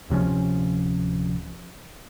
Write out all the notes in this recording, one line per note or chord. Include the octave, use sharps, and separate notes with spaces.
D1 C3 F3 C#4